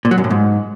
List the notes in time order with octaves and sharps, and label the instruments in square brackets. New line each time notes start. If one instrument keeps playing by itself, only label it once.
[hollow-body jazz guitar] A#2
F#3
F#2
A2
G#2